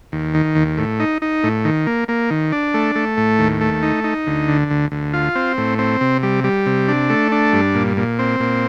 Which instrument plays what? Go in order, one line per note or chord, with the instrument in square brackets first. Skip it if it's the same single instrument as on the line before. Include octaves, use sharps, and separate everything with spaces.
[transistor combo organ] D#2
D#3
D#2
A2
D#4
D#4
A2
D#3
A#3
A#3
D#3
D4
A3
A3
A2
D#2
A3
D#4
D#4
D2
D3
D2
D2
F4
C4
A2
C4
C3
G3
G3
C3
D4
A3
D4
G2
A#2
A#2
C4
A#2